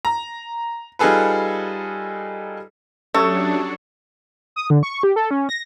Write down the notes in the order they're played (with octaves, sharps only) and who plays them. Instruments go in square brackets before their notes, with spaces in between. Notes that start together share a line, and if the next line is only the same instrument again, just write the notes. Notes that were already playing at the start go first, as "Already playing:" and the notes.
[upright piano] A#5
G3 D#4 F4 G#4 A4 B4
[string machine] F#3 D4 [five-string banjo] A3 [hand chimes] C#4 G4 D#6 [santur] A4 C#5
[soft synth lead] D#6
D3
C#6
G4
A4
C#4
A#6